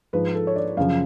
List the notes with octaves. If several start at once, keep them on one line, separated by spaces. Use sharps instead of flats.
G#2 F3 B4
A4
C#5
D5
F#2 C#3 F3 F5